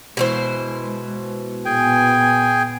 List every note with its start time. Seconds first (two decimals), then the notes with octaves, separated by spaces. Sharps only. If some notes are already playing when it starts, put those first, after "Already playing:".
0.17 B2 E3 G#3 C5
1.65 A#2 B3 G#4 G5 G#5